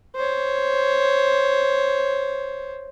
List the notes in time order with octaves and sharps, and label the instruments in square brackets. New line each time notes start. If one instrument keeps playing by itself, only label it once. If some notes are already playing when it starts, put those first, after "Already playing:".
[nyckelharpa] C5 C#5